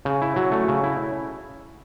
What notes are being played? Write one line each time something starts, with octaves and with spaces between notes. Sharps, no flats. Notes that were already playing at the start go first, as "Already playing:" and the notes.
C#3
E4
F#3
A3
C#3
E4